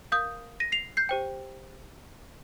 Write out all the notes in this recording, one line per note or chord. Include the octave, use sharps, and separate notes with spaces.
A#4 F5 D#6 G6
A#6 D#7
C7 F7
G6 C7
G4 C5 G5